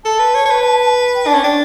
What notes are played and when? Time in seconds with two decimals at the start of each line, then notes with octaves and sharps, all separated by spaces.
0.04 A4 A5
0.19 B4
0.35 C#5
0.45 C#5
0.50 B4
1.15 G5
1.26 D4 A5
1.34 C#4
1.43 D4 G5